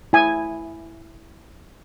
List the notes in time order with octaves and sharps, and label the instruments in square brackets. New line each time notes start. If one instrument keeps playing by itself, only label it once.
[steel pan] E4 G#5